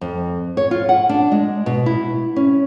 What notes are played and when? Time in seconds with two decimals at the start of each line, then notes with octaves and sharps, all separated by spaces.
0.01 F2
0.57 C#5
0.71 F4
0.89 F#5
1.09 D4
1.32 G#3
1.66 B2
1.86 E4
2.36 C#4